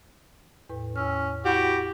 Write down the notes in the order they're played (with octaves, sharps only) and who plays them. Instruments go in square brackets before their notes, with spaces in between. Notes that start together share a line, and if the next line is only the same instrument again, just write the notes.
[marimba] E2 A2 B4
[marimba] E2 E6 F6 [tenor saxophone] C#4
[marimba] E4 B5 [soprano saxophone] F#4 [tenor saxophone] G4